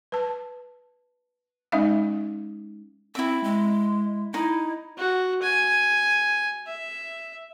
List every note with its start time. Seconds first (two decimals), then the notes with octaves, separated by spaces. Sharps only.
0.12 B4 A5
1.72 G#3 C#4 D#4 E5 F5
3.15 C4 E4 E5
3.44 G#3
4.34 D#4 E4
4.98 F#4
5.42 G#5
6.67 E5